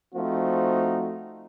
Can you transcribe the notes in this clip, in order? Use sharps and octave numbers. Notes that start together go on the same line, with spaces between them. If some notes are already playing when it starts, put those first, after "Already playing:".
F3 A3 C4 D#4 F#4